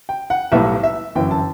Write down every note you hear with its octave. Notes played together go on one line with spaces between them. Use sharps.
G5
F#5
B1 A2 G3 B3 E5
E5
G1 F#2 E3 G5
A5